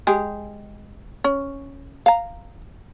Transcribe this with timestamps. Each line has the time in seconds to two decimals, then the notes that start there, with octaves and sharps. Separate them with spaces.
0.07 G#3 G4 G#4
1.24 C#4
2.06 F5 A#5